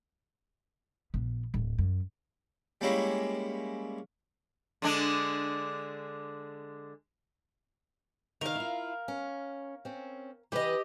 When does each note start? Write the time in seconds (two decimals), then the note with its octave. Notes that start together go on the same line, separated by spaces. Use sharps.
1.14 A#1 B3
1.54 D1
1.78 F#2
2.81 G3 G#3 A#3 C#4 E4
4.82 D3 G#3 D4
8.41 D#3 A#3 A#4 F5
8.56 E4 F4
9.08 C#4
9.85 C4 C#4
10.52 E3 E4 G4 B4 D#5